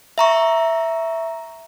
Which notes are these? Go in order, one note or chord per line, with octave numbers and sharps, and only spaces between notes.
E5 A#5 C#6